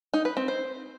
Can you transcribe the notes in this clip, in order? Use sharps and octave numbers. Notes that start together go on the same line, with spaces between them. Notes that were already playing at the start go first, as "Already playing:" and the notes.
D#4
B4
C4
C5